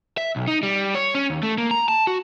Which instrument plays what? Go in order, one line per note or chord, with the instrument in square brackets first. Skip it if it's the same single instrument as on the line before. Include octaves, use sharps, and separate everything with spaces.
[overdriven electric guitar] E5
B1
D#4
G3
C#5
C#4
D#2
A3
A#3
A#5
A5
F#4